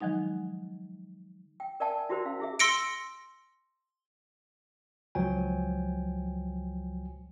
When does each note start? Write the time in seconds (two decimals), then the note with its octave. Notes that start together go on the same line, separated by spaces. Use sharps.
0.01 D#3 F3 F#3 G#3 D#4
1.60 G5
1.80 A#4 D5 E5 G5 A5
1.91 G#5
2.09 E4 F#4 G4 A#4 C5
2.25 C#4 F5
2.39 E4 G#4 E5
2.59 C6 E6 A#6 C#7 D7
5.15 C#2 F3 F#3 G5 G#5